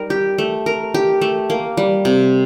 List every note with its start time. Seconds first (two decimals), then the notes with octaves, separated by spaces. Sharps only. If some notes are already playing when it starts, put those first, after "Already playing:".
Already playing: G3 D#4 A#4
0.10 G4
0.38 A3
0.66 A#4
0.94 G4
1.21 A3
1.50 A#3
1.77 G3
2.05 C3